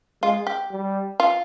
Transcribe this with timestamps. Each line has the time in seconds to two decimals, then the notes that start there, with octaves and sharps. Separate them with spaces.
0.22 G#3 F4
0.47 G4
0.71 G3
1.20 F4